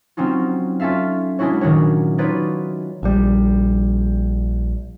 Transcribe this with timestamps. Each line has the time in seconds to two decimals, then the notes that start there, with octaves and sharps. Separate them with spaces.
0.17 F#3 C4 C#4 D#4 F4
0.80 C#4 F4 A4 E5 F5
1.39 G#3 C#4 D4 E4 F#4 C#5
1.61 A#2 D#3 F#3 F#4 C#5
2.18 D#4 F4 F#4 B4 C#5 D5
3.03 A#1 G3